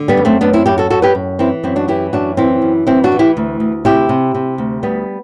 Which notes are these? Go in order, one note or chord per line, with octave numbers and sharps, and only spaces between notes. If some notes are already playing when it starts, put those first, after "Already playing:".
Already playing: D3
G3 B3
F#2
A3 C4
F#2 B3 D4
C4 E4
F#2 E4 G4
F#4 A4
F#2 F#4 A4
G4 B4
F#2
E3 C4 E4
F#2 C4 E4
D4 F#4
E3 E4 G4
F#2 D4 F#4
E3 C4 E4
F#2
E3 C4 E4
D4 F#4
E3
E4 G4
D2
D2
C3 E4 G4
C3
C3
D2
D2 G3 B3